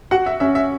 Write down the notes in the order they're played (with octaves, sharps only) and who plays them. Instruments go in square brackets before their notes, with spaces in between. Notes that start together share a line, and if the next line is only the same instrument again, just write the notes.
[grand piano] F#4 [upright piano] F#5
[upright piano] E5
[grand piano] C#4 [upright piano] E5
[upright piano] E5